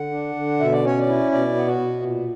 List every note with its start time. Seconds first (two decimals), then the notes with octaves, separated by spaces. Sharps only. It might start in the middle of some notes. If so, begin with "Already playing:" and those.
Already playing: D3 F#5
0.11 D4
0.35 D3
0.60 B2 E5
0.72 D5
0.84 C#4 C#5
0.99 D5
1.07 E4
1.32 B2 D5
1.55 B3
1.67 F#4
1.80 B2
2.03 A#2